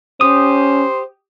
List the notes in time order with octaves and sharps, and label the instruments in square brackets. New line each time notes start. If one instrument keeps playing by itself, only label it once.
[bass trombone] C#4 [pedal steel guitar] G4 D#6 [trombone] C5